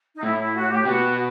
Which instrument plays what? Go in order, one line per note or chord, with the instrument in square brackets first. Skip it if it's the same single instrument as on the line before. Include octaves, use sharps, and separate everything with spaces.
[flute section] D#4
[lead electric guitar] A2 [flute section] E4
[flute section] E4
F#4
G4
[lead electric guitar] B2 [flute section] F#4